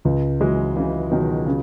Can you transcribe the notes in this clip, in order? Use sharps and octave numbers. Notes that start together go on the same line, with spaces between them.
C#2
E3 F#3 G#3
C#3 E3 F#3
B2 D#3 F#3
C#3